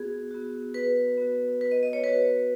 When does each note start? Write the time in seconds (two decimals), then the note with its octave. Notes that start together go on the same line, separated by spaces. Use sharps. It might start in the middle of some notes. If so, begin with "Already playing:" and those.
Already playing: B3 F#4 G#4
0.31 B3 F#4
0.74 B4
1.18 B3 F#4
1.61 B4
1.72 D#5
1.83 D#5
1.93 C#5
2.04 B3 F#4 B4